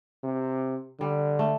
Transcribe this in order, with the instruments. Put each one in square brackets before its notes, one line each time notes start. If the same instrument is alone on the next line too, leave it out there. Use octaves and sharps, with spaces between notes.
[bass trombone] C3
[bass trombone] D3 [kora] G3
[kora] A3